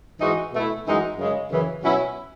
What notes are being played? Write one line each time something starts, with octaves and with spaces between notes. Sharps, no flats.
G#2 E3 G#3 D#4 F#4
B2 A3 E4
F#2 E3 G#3 D#4 F#4
F#2 C#3 G#3
F#2 C#3 E3
B2 F#3 C#4 E4